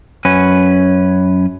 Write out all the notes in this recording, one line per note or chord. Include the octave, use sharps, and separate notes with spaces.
F#2 C#4 B4